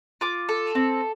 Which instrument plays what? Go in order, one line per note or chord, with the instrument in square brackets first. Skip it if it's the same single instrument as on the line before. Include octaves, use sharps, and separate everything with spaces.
[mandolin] F4 D6
A4
C4